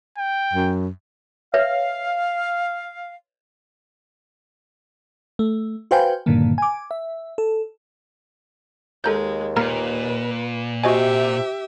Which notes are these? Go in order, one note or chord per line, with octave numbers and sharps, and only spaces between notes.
G5
F#2
B4 C#5 E5 F5
A3
F#4 B4 C5 F5 G5 G#5
G2 A#2 D3 D#3 A#3
G#5 D6
E5
A4
D#2 G#3 A4 A#5 G6
A#2 A#3 A#4 B4 A#5
C3 F#4 G4 D#5 E5 G#5